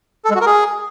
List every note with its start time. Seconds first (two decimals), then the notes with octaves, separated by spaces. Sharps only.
0.25 A4
0.30 G#3
0.35 F#4
0.41 A#4
0.46 G#4